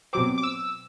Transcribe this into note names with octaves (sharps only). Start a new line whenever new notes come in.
B2 F#3 C4 D6
D6
E6